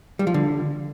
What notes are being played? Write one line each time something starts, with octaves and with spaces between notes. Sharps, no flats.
G3
F3
D3